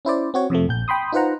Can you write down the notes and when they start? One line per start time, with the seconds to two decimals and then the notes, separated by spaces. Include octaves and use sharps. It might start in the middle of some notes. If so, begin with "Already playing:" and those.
0.05 C#4 E4 C5 D5
0.34 C4 F#4 C#5
0.50 F2 C3 F3 A3
0.69 A#1 G6
0.88 G5 B5 C6 D#6
1.12 D#4 F4 B4 C5 F#5 A#5